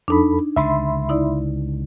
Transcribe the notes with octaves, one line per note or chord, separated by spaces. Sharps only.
F2 D4 D#4 A4 B5
C#2 D3 E5 B5 C6
D#4 E4 D5